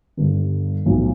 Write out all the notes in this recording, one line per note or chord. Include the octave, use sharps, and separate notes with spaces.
G1 G2 D3
B1 A2 F3